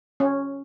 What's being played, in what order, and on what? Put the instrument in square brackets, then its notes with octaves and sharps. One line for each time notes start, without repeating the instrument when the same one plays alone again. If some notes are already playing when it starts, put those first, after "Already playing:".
[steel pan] C#4